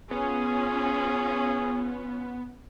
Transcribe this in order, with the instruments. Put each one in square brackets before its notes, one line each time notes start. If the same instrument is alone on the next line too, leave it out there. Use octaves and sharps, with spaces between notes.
[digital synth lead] B3 [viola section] C#4 F4 [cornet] G#4